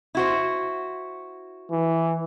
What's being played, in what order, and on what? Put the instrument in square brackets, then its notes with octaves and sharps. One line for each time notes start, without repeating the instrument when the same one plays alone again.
[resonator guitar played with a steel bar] E4 F#4 C5
[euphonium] E3